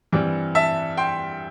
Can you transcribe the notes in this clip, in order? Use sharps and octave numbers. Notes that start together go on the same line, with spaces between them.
G2 E3 G3 C4
E5 A5
G5 C6